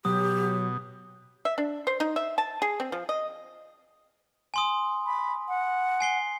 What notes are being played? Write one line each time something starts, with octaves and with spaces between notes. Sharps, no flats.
B2 F#3 G4 D#6
E5
D4
C5
D#4
E5
A5
G#4
C4
F3
D#5
G#5 C6 D#6
B5
F#5
G#5 C7 G7